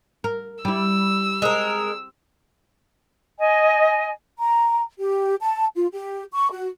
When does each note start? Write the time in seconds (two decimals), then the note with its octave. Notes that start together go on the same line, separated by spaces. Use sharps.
0.24 A#4
0.65 G3 E4 E6
1.42 G#3 C4 A#4
3.39 D#5 G#5
4.38 A#5
4.99 G4
5.41 A5
5.75 F4
5.92 G4
6.32 C#6
6.51 F#4